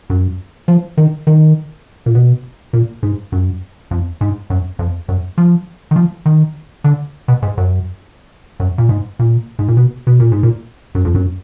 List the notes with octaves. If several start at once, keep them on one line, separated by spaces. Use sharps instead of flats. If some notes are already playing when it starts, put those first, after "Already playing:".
F#2
F3
D#3
D#3
A#2
B2
A#2
G#2
F#2
F2
G#2
F#2
F2
F#2
F3
D#3
F3
D#3
D3
B2
G#2
F#2
F#2
A#2
G#2
A#2
G#2
A#2
B2
B2
A#2
G#2
A#2
F#2
F2
F#2